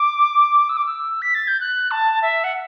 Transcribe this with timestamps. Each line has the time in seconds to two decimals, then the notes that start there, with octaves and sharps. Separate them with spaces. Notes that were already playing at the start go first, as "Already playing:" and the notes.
Already playing: D6
0.69 E6
0.77 D6
0.86 E6
1.22 B6
1.35 A6
1.48 G6
1.60 F#6
1.91 A5
2.22 E5
2.44 F#5